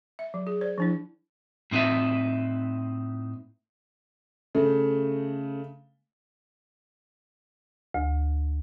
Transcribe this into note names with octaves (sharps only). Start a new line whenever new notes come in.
E5
F#3
G#4
C5 D5
F3 D4 E4
A2 C4 D#4 B4 E5
C#3 A3
D2